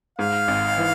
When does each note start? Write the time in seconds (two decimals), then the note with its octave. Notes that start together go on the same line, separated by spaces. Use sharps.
0.19 G#2 F5
0.48 G#1
0.78 E3